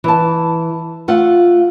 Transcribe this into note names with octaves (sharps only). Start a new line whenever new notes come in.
E3 A5
A3 F4 F#5